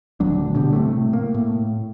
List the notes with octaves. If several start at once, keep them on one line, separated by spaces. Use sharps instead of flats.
D#1 D2 F#3 D4
B2 D3 G3
A2 C3 A3
A#3
A2